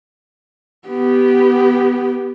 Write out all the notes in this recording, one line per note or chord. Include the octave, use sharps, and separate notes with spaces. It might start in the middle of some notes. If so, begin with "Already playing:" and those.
B3 G4